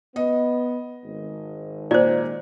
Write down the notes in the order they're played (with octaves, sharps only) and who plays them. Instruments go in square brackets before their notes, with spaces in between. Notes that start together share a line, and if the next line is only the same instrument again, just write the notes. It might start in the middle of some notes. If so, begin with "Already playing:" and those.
[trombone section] B3 [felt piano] D#5
[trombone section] G#1 D#3
[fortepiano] A#2 [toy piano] C5 D5